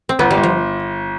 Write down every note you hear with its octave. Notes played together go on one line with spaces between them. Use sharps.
C4
G1 B3
G3
G1
F3